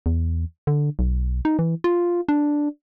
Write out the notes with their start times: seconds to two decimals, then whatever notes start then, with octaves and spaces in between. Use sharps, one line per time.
0.06 E2
0.67 D3
0.99 B1
1.45 D#4
1.59 E3
1.84 F4
2.29 D4